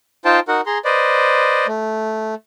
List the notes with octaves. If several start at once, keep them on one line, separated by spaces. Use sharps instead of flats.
D#4 F4 C5 G5 A5
D#4 F#4 A#4 F#5
G#4 A#5 C6
B4 C5 D5 D#5
A3